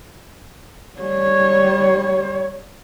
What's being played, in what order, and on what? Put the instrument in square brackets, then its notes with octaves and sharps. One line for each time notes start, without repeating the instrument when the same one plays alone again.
[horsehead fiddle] G3 C#5